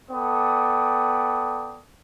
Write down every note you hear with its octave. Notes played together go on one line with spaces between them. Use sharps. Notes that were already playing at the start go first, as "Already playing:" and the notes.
B3 A4 D5 G5 D#6